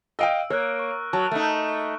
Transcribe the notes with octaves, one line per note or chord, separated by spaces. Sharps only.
D#5 F5 G5 E6 D7
A#3 C#5 F6 F#6
C#6
F#3 A5 C#6
A3 D#4